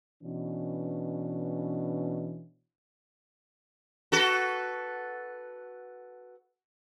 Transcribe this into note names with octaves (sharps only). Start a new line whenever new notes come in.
B2 E3 C#4 D4
F#4 A4 B4